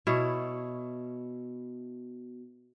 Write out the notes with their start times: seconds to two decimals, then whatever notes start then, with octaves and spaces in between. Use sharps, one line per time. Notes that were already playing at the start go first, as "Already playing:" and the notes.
0.07 B2 E4 C#5